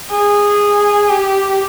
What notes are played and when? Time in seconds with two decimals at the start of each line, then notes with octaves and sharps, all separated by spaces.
0.10 G#4
1.10 G4